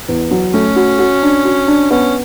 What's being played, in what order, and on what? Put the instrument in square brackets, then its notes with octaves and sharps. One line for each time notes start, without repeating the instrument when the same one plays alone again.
[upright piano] E2
F#3
[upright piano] A3 [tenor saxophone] C#4
[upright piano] F#4
F#4
D4
F#4
D4
[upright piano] B3 [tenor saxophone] C#4